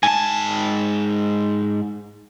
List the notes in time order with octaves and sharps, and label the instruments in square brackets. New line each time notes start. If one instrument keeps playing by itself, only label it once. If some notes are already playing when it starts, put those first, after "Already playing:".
[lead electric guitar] G#2 A5 [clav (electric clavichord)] G#5